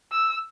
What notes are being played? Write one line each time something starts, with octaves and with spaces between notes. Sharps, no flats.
E6